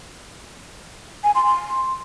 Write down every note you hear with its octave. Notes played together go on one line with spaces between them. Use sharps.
G#5
C6
C6